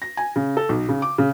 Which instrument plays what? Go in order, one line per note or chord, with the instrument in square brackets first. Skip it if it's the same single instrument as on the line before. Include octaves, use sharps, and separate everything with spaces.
[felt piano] A#6
G#5
C#3
A4
B1
C#3
D6
C#3